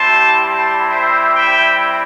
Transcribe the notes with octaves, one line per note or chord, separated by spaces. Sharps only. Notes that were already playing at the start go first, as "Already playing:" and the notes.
Already playing: G3 C4 E4 G4 A5 C6
A5 C6
C5 E5
E5 G5